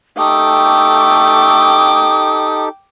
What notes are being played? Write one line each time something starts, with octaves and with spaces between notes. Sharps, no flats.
A3 D#4 G4 A4 G5 D6 D#6